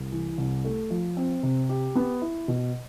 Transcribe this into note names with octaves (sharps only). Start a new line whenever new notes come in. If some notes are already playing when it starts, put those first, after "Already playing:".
Already playing: C2
E3
C2
A3
F3
C4
C3
G4
B3
E4
B2